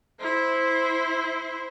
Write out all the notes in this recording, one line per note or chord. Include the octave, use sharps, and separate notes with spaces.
E4 C5